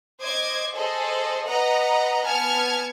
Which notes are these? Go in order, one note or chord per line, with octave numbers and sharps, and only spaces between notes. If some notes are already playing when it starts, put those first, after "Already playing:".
C5 D#5 D6 G#6
G#4 A4 C5 D#5
B4 D#5 F#5 A#5
B3 G#5 A5 F6 G#6 C#7